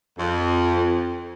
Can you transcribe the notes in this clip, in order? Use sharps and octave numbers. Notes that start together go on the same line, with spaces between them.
F2